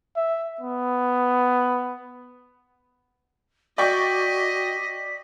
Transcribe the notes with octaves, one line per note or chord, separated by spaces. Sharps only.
E5
B3
F#4 D5 D#5 G5 C#6 B6